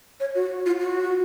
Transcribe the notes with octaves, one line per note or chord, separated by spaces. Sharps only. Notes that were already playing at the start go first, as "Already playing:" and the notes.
C#5
F#4
F4
F#4